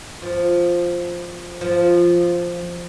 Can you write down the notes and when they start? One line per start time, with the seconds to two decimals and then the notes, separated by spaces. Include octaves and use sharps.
0.22 F3
1.61 F3